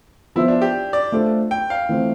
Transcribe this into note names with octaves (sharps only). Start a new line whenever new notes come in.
F3 B3 E4 F4 C5 E5
D4
G4
D5
A3 D4 F4 A4 C5
G5
F5
E3 A3 C4 F4 C5